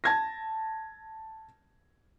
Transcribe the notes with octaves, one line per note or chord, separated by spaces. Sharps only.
A5 G#6 A#6